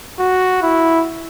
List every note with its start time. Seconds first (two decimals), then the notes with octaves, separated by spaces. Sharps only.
0.18 F#4
0.62 E4